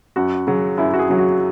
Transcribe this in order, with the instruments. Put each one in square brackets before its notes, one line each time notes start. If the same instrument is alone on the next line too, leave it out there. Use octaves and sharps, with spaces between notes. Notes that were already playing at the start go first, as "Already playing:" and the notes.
[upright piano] F#2 F#4
C#3 F#3
F#2 E4
F#4
G#4
C#3 F#3
F#4